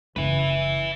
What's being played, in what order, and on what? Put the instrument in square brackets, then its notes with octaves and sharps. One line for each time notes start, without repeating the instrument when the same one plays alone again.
[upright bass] F#1 [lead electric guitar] B4 E5